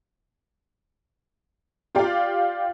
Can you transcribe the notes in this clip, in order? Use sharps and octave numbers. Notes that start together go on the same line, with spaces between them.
F4 G4 D5 F5 G5